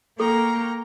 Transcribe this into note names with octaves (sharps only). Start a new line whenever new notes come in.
A#3 A4 G5 A#5 C#6